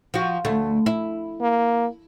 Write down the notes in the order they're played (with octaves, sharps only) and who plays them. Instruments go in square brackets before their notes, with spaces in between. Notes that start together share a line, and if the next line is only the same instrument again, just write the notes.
[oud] F3 F#4
D2 A3
E4
[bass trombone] A#3